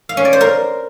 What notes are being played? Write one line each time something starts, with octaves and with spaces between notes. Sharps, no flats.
F5
C#4
D5
C5
A#4